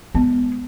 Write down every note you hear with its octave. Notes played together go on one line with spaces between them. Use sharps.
G#3 B3